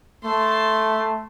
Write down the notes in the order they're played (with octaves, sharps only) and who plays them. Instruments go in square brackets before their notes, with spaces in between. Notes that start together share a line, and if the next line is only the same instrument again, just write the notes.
[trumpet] A3 [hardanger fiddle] A5 C6